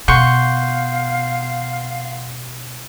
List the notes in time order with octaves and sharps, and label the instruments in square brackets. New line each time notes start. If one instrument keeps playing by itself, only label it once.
[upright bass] B2 [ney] F5 [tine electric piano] F#5 C6 G6 [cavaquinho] C#6